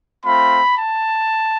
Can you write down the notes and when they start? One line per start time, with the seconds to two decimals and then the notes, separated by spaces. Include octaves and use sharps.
0.24 A3 C4 F4 B5
0.77 A5